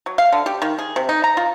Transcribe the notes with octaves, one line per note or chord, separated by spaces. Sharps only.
F#3
F5
D3
G4
D#3
G#4
C3
D#4
A#5
F4